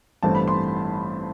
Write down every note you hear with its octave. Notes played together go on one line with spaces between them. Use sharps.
A1 G2 E3 A3 C4 A5
B5
C6